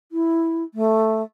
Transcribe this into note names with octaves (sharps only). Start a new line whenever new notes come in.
E4
A3